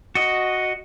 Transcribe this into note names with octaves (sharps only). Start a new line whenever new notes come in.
F#4 D#5